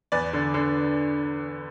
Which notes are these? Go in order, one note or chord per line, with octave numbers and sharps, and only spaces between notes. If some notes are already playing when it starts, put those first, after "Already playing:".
E2 B4 D5
D3
D3